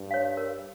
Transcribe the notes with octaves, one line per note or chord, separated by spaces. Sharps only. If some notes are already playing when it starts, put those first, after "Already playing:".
Already playing: G2
C#5 F5
A#4